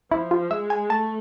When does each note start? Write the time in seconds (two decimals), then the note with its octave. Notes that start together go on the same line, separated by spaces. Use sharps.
0.11 F3 E4
0.31 F4
0.50 G#3 E5
0.70 G#5
0.89 A3 A5